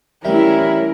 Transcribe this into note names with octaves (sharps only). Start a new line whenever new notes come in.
E3 G3 A3 C#4 E4 A#4 E5